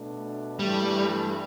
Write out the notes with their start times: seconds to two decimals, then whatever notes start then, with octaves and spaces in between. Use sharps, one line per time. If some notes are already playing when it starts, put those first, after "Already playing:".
Already playing: B2 A3 D4
0.59 G2 E3 G3 A3